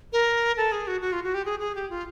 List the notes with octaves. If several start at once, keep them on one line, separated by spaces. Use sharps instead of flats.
A#4
A4
G#4
F#4
F#4
F4
F#4
G4
G#4
G#4
G4
F4